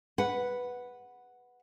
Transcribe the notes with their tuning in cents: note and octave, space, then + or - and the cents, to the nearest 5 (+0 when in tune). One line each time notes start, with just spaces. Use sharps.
B4 +0 F#5 +0